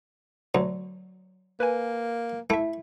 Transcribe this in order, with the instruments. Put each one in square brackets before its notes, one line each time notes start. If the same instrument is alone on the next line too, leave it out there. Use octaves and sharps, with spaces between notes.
[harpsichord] D2 [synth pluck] F#3
[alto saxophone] A#3 [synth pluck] B4 G#5
[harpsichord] A3 [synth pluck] E4 E5